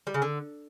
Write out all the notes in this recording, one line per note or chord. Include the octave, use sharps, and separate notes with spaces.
G3
C#3
D3